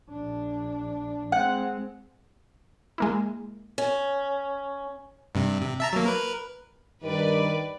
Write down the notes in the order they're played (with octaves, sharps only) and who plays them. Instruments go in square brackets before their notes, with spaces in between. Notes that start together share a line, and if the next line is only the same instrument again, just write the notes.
[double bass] A#1 D4
[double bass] G#3 C4 [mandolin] F#5
[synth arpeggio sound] G#3 A#3 E4
[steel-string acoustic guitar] C#4
[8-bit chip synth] G2 C3
C3
E5 A5 A#5
F#3 A#3
A#4 B4
[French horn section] G2 A#4 [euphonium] D#3 [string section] B4 D5